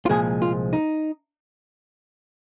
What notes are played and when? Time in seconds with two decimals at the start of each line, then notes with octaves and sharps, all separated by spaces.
0.06 F4
0.09 C2 A#2 F3 G#3 G#4
0.42 F4
0.73 D#4